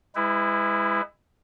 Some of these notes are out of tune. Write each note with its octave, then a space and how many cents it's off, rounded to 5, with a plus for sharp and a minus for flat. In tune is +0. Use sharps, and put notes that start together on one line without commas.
G#3 -25 E4 +0 B4 +30